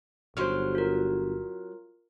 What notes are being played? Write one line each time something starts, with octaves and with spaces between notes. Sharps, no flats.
G1 F#3 C#4 C5 C6 F6
F4 A#4